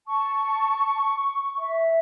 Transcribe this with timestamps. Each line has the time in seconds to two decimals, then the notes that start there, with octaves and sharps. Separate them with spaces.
0.07 A5 C#6
1.57 E5